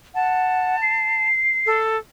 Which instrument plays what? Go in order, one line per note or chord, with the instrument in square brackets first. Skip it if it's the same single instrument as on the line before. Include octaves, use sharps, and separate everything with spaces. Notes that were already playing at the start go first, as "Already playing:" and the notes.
[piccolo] F#5 [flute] A5
[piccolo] C7
[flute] A4